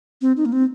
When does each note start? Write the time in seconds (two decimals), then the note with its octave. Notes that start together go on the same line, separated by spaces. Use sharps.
0.22 C4
0.37 D#4
0.45 A#3
0.53 C4